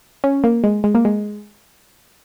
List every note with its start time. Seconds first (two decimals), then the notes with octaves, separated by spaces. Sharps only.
0.24 C#4
0.44 A#3
0.64 G#3
0.84 G#3
0.95 A#3
1.05 G#3